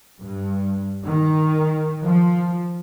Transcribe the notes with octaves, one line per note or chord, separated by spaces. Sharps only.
G2
D#3
F3